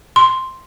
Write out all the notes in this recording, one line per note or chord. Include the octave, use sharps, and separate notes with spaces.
C6